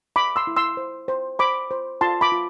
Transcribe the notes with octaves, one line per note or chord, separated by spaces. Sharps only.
G#4 B5 D6
C6 E6
E4
C6 E6
C5
C5
C5 B5 D6
C5
F4 A5 C6
B5 D6
F4